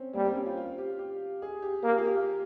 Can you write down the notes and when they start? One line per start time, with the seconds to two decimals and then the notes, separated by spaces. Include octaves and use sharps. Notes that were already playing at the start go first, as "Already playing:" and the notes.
Already playing: C4 C#4
0.15 G3 A#3
0.25 C4
0.36 C#4
0.46 F4
0.57 F4
0.78 G4
0.99 G4
1.42 G#4
1.62 G4
1.84 A#3 G#4
1.91 G4
1.98 F4
2.05 G4